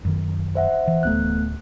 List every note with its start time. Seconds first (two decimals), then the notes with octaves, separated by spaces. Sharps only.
0.05 F#2 D#3
0.55 C5 E5 F#5
0.88 E3
1.03 D1 A3 B3 F#6